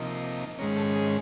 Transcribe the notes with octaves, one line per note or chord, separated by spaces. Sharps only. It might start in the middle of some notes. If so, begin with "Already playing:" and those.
Already playing: C3 F3 A#3 D#4
G#2 D#3 G#3 C#4 A#4
A4
G#4